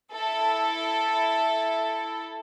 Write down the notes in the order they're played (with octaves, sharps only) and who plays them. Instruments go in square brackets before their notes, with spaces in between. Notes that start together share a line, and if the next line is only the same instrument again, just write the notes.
[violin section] E4 A4